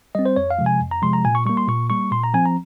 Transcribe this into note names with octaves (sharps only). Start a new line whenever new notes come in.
G3 C4 D#5
C5
F2 C#5
F5
C3 F3 G#3
G#5
F2
A#5
C3 F3 G#3 C6
A#5
A#2 G#5
C#6
G3 A#3 C#6
C6
A#2 C#6
G3 A#3 C#6
A#2 C6
A#5
F3 C4 G#5
A#5